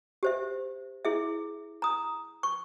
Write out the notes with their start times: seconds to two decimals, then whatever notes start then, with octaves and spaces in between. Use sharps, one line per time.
0.23 G4 C5 E5
1.05 E4 G#4 E5
1.82 A#5 D#6
2.43 C#6